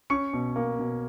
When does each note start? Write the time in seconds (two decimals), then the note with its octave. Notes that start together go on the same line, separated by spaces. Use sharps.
0.10 C#4 C#6 C#7
0.33 B2
0.56 A#3
0.79 B2